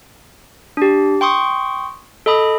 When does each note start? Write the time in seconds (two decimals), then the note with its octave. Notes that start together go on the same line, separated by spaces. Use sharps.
0.77 D4 G4
1.21 G5 C6 C#6 D#6
2.26 A4 D#5 B5 D#6